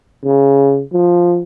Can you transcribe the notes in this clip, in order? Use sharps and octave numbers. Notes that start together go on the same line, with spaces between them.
C#3
F3